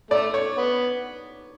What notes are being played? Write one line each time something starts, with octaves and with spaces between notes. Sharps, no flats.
A3 D5
C#5
B3